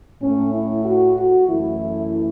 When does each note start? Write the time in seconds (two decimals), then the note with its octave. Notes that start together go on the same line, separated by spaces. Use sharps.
0.22 A2 A3 C#4
0.54 E4
0.85 F#4
1.17 F#4
1.48 F#2 E3 A3 E4